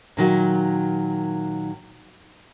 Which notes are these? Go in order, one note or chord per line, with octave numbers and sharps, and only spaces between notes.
A#2 D#3 F#3